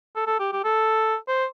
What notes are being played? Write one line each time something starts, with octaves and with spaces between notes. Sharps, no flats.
A4
A4
G4
G4
A4
C5